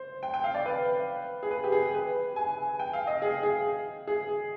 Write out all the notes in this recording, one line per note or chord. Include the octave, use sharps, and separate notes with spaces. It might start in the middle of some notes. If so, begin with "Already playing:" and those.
Already playing: C5
G5
G5
F5
D5
B4
G#4
B4
G4
G#4
B4
G#5
G5
F5
D#5
G#4
G#4
G#4